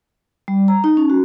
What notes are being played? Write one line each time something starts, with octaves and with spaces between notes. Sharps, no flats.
G3
A#5
D#4
C#4
F#4